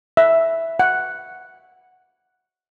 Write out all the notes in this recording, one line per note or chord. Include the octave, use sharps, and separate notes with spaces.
E5
F#5